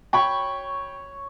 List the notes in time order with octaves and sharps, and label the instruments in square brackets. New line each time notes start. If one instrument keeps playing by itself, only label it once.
[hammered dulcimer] C#5 B5 C#6 [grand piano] G5